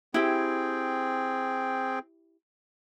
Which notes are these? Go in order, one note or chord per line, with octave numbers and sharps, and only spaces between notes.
C4 E4 G4 G#4 G5